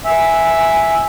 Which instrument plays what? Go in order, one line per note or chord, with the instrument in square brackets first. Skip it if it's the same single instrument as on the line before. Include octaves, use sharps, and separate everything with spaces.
[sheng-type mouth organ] E5 [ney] G#5